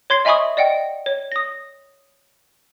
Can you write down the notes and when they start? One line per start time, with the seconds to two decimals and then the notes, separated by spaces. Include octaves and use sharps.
0.10 C#5 C6 G#6 C7
0.25 D#5 E5 G#5 B5 C#6 D#6
0.57 D5 D#5 F#5 G5
1.06 C#5
1.32 D#6 A#6